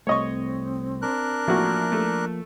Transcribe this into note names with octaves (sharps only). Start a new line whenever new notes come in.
C2 A3 C4 C#5 D#5 C#6
D4 A#4 F#6
A1 F3 A#3 F#4
A3